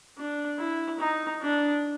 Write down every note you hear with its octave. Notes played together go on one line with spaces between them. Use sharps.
D4
E4
D#4
D4